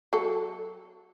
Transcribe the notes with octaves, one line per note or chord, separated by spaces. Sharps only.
F#3 A4